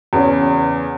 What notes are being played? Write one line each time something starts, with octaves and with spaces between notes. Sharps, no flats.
E2 C#3 C#4